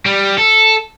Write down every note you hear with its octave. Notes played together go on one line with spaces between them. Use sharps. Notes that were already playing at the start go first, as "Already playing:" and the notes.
G3
A4